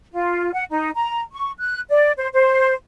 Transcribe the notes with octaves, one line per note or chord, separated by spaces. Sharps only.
F4
F#5
D#4
A#5
C#6
F#6
D5
C5
C5